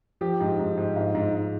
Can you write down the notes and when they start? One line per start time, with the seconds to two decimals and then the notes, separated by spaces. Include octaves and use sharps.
0.21 F3 G4
0.40 G#2
0.59 G#2
0.77 G#2
0.96 G#2 F5
1.15 G#2
1.33 G#2